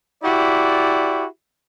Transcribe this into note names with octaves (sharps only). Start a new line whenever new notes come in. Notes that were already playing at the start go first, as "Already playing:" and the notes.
E4 F#4 G4 D5